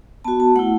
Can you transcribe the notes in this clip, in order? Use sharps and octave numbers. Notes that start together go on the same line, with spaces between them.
B3 F#4 A5
A5
A3 E4 F#5